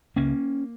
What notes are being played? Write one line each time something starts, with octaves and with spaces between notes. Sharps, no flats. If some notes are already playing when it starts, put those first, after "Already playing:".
C#2 C#3 A#3 C#4